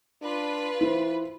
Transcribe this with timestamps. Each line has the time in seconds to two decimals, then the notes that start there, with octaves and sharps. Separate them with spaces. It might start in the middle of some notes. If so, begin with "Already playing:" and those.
0.22 D4 F4 B4
0.81 E3 E4 C5